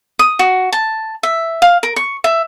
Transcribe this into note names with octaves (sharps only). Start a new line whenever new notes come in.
D#6
F#4
A5
E5
F5
A#4
C#6
E5